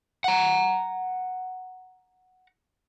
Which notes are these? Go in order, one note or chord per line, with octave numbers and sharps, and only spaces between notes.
F#5 A#5